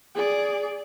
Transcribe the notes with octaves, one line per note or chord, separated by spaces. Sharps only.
G#4 D5